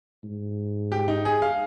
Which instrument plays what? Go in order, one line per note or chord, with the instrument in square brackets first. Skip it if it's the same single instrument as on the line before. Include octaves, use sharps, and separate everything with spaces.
[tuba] G#2
[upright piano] G4
D#4
G#4
F5